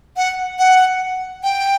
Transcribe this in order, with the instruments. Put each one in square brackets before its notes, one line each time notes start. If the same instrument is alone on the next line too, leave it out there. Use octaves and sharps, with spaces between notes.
[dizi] F#5
F#5
G5